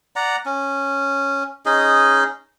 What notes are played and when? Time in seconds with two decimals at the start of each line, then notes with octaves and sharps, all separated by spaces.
0.16 D5 F#5 A#5
0.46 C#4
1.66 C#4 D#4 G#4 D#5